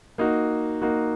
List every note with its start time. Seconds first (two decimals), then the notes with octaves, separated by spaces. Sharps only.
0.18 A#3 D#4 F#4
0.82 A#3 D#4 F#4